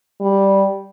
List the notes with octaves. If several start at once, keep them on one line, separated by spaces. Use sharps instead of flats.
G3